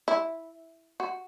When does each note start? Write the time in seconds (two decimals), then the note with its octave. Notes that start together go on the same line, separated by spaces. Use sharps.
0.08 E4
1.00 F#4